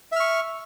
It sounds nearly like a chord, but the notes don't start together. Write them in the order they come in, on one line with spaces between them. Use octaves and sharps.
E5 F6 C#6